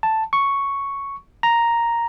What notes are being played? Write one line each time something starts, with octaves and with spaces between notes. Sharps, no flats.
A5
C#6
A#5